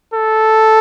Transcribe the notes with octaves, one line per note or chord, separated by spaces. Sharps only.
A4